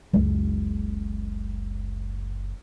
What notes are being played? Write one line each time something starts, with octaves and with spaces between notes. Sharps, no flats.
F#1 C#2